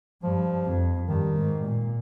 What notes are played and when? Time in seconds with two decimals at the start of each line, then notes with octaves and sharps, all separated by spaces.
0.23 G2 F3
0.66 F2
1.08 G2 D#3
1.38 G#2
1.66 A#2